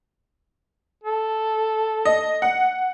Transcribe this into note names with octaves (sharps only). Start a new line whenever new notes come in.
A4
D#5
F#5